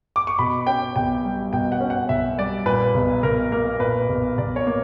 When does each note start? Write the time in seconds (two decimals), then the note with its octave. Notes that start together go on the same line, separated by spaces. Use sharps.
0.16 D6
0.27 C#6
0.39 B2 B5
0.67 C#4 G5
0.96 B1 G5
1.25 G3
1.53 B2 G5
1.72 F#5
1.80 C#4
1.90 F#5
2.09 B1 E5
2.38 G3 D5
2.66 A#2 B4
2.94 B1
3.23 B1 A#4
3.52 A#3 A#4
3.80 A#2 B4
4.09 B1
4.38 B1 D5
4.56 C#5
4.67 A#3